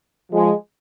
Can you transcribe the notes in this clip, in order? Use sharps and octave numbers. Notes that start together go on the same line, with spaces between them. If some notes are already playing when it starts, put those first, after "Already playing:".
F3 G#3